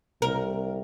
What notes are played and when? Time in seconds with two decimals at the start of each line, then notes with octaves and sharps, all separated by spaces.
0.22 C2 A#4